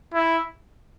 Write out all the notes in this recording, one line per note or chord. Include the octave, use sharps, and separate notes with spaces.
E4